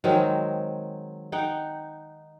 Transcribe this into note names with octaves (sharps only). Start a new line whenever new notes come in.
D#3 F#3 G#3 C4
D#4 F#5 G5